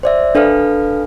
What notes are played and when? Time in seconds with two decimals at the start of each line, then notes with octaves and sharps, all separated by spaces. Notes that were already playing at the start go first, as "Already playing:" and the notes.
0.03 C5 D5 E5
0.35 D4 A4 B4 F5 F6